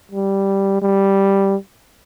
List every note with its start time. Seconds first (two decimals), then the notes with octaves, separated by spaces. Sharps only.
0.12 G3
0.82 G3